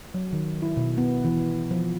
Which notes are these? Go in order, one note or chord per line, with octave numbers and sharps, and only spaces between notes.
F#3
D#3
E4
B2
B3
E3
F3